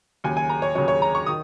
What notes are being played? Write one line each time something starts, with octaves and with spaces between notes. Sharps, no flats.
D#2 C#3 F#3 G#5
G#5
A#5
C#5
D#2 C#3 F#3 C#5
C#5
A#5
C#6
D#3 D#6